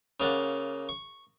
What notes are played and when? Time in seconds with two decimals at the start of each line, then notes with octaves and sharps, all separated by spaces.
0.20 C#3 A#3 D5 F#5
0.89 C#6